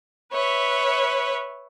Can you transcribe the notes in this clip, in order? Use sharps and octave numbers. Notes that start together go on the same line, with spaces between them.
B4 C#5 E5